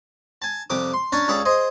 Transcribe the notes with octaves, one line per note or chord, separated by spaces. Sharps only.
G#5 A5
C2 F2 G4 D6 D#6
C6
C#4 D4 C#5 A5 A#5
C#2 G3 G#4 A4 C#5 B5
G#4 C5 D#5